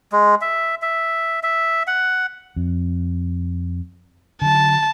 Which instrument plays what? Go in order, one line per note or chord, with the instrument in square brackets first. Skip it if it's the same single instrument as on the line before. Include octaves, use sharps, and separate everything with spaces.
[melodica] G#3
E5
E5
E5
F#5
[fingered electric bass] F2
[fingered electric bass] D3 F#3 [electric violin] A5